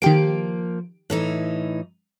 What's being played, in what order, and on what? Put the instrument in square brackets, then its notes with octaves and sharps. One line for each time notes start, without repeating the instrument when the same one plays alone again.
[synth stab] D#3 G4 D7 [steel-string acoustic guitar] F3 A#3
[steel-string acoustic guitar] A2 E3 D#4